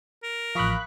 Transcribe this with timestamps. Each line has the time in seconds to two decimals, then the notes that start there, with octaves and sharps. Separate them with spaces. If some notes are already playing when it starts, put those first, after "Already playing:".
0.24 A#4
0.55 A1 F3 F5 B5 C#6 D#6 F#6